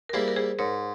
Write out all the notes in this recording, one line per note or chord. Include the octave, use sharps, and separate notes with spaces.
A#4
G3 A#3 E4 G#4 C5
A#4
G#4 C5
G#2 A#4 C#5